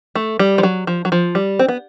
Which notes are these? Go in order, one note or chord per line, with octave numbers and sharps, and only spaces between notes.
A3
G3
F3
F#3
F3
F#3
F3
G3
C4
B3